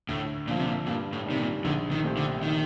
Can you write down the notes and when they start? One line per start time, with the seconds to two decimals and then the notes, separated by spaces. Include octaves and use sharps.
0.08 D2 A2
0.47 A#2 D3 F3
0.57 C3
0.66 A#2
0.86 G2 A#2
1.13 A2
1.26 C3 D#3 G3
1.39 A#2
1.65 A#1 D3
1.91 D#3
2.04 A#2 A3 C4 G4
2.17 D3
2.43 D#3